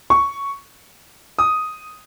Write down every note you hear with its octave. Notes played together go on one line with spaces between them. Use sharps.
C#6
D#6